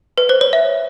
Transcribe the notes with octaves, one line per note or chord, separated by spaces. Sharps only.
B4
C5
C#5
E5